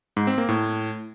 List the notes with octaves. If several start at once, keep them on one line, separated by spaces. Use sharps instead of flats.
G#2
C4
A#3
A2